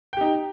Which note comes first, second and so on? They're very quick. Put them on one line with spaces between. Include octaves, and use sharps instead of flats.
G5 G4 D#4